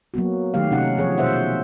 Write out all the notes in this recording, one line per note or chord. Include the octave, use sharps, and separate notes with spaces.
F#3 A#3 B3 F#4
D#3 F#3 A3 G4 F5
C3 C#4 D#4 F#5
F3 G#4 C#5
B2 C5 E5 F#5